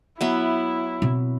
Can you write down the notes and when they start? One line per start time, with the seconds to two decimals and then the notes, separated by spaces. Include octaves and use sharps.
0.21 F#3 B3 E4 E5
1.02 B2 C4